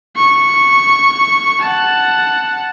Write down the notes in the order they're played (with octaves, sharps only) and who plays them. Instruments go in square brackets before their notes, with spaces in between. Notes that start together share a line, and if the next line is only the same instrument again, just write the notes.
[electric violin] C#6
F#5 A5